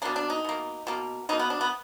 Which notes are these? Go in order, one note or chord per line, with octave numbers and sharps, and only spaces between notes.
B2 A#3 D4
D4
D#4
B2 A#3
B2 A#3
B2 A#3 D#4
B3
D4
B3